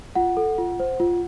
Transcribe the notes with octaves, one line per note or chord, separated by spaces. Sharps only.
F4 F#5
A4
F4
C5
F4